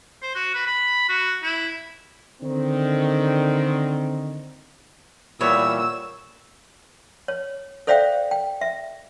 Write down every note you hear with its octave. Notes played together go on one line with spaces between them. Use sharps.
C5
F#4
B4
B5
F#4
E4
D3 D#3 C4
A#2 E3 G3 B3 C#5 E6
C#5
A4 C5 D5 E5 F5 G5
G5
E5